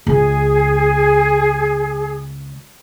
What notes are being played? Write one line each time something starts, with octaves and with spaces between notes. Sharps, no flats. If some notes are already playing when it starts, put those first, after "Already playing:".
C#2 G#4